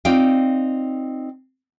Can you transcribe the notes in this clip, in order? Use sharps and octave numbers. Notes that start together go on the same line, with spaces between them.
C4 D#4 F4 D5 F5 G5